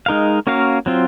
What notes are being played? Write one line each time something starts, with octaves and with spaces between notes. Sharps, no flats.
G#3 D#4 A#4 F5
A#3 C#4 F#4 A#4 F5
F#3 C4 F4